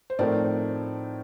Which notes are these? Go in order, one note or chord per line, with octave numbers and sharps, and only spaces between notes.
C5
A2 F3 A3 C4 D#4 A#4 D5